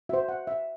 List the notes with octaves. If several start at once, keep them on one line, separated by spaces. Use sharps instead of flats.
F#4 C5 E5
F#5
E5